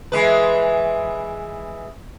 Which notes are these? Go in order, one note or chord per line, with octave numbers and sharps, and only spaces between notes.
E3 G#3 B4